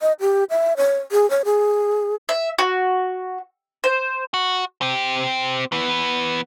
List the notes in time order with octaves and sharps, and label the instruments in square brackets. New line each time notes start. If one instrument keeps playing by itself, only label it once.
[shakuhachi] D#5
G4
E5
C#5
G#4
C#5
G#4
[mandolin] E5
F#4
C5
[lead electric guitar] F#4
C4 G4
E3 B3